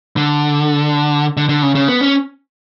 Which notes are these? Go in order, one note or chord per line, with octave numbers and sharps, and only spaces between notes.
D3
D3
D3
C#3
C#3
B3
C#4